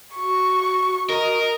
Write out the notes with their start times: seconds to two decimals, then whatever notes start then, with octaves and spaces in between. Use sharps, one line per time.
0.15 F#4 C#6
1.10 A#4 D#5